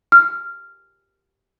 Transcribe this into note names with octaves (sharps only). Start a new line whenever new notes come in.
F6